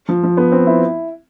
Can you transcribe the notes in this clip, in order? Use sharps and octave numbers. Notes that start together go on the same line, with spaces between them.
F3
F3
B3
C4
E4